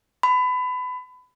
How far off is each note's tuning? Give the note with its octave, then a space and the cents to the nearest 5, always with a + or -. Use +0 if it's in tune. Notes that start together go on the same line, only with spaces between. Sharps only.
B5 +25